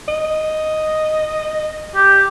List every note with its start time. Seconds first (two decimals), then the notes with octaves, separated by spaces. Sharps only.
0.09 D#5
1.96 G4